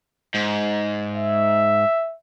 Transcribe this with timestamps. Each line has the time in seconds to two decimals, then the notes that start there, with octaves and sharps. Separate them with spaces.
0.34 G#2
1.15 E5